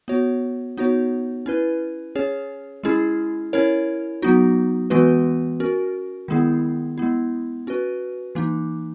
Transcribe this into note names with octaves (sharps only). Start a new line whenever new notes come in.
B3 F#4 C#5
B3 D#4 F#4 C#5
C#4 E4 B4
C#4 G#4 C#5
G#3 C#4 E4 G#4
C#4 E4 A#4 C#5
F#3 B3 D#4 F#4
E3 G#3 B3 F#4 B4
C#4 F#4 A#4
D#3 G#3 B3 E4 G#4
G#3 B3 E4
C#4 F#4 B4
E3 A#3 D#4